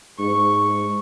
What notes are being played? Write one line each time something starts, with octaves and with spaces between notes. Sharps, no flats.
G#2 C#6